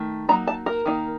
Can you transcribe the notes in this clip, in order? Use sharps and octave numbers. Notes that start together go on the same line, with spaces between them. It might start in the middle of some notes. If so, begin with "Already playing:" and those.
Already playing: D#3 A3
F#3 A#3 D#4 A#5
A5
A#4
D#3 A#3 D#4